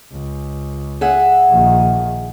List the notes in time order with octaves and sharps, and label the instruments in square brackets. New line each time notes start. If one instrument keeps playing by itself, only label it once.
[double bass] C#2
[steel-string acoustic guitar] G#4 E5 F#5
[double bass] A#1 D#3